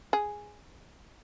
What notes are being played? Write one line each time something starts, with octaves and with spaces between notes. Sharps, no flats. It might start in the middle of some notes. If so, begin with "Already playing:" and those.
G#4